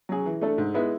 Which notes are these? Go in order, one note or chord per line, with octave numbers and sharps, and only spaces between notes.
F#3 C#4 G#4
E3
A3 D4 A4
G#2
G#3 B3 E4